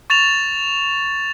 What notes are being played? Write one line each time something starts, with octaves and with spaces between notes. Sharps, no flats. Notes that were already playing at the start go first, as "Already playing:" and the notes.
C#6 A6 E7 F7